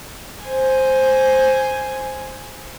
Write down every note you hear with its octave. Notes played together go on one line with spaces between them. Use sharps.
C5 G#5